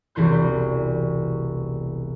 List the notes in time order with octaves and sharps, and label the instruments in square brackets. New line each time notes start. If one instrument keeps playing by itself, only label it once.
[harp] E1 C2 E3 C6 G6